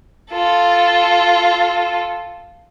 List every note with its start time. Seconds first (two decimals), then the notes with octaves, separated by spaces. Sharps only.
0.32 F4 A4